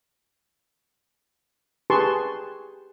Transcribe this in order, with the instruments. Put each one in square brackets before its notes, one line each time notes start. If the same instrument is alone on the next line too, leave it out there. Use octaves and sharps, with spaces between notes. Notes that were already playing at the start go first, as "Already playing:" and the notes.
[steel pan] G4 G#4 B4 A5 C6 C#6